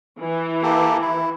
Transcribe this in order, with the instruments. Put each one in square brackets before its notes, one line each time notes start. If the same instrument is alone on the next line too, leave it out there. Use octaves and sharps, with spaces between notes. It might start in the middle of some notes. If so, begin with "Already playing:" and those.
[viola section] E3
[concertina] A#3 G4 A4
E4